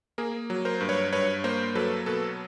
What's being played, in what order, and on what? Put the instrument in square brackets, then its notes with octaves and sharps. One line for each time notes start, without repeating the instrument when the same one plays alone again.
[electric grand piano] A#3 G#4 A#4
F#3
A#4 C5
G2
B4 C#5
G2 B4 C#5
A#3 A#4 C5
F#3 A4 B4
B2 A4 B4